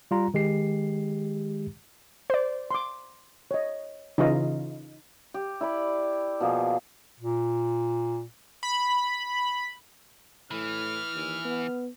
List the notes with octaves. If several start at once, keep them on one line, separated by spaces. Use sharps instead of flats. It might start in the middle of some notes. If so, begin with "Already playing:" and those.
G3 F4 A#5
D#3 G#3 G4 C7
C5 D5
C6 D6
C#5 D#5
C#3 E3 D#4 F4 D#5
G4
E4 D5 B5
B2 F3 A#3 G#4
A#2
B5
A2 E3 F6
D#2
B3